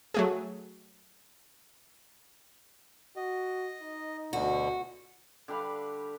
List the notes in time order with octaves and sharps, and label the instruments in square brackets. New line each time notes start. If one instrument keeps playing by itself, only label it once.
[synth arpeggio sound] F#3 A3 G#4
[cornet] F#4 [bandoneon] D#5
[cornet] D#4
[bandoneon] D2 B2 D3 [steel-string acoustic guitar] F#4
[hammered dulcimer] D3 G3 B4 F5